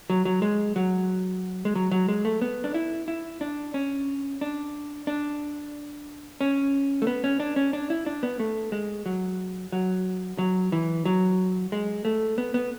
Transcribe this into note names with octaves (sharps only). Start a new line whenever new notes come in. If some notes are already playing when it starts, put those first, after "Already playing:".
F#3
F#3
G#3
F#3
G#3
F#3
F#3
G#3
A3
B3
D4
E4
E4
D4
C#4
D4
D4
C#4
A3
B3
C#4
D4
C#4
D4
E4
D4
B3
A3
G#3
F#3
F#3
F#3
E3
F#3
G#3
A3
B3
B3